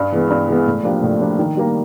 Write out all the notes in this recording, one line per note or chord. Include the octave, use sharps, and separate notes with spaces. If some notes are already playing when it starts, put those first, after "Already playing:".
Already playing: G2
E3 G#3 B3
G2
E3 G#3 B3
A2
F3 A#3 D4 G4
A2
F3 A#3 D4 G4
D#3
G3 A#3